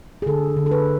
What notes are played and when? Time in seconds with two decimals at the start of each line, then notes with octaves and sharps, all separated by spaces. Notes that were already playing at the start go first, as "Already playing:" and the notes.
0.22 G#4
0.26 D3 A4
0.56 D3
0.66 A4
0.71 B4